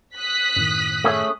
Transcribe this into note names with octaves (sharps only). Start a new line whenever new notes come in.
D#6 F#6 B6
F#2 A2 D#3
A3 C#4 G#4